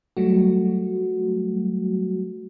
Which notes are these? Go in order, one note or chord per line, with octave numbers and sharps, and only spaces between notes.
F#3 G3 A3 F#4